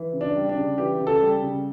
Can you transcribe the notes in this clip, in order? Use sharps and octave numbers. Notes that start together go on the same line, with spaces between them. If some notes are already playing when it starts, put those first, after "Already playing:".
Already playing: E3
C#3
D4
G3
D4
C#3
E3 G4
C#3
A4
G3
C#3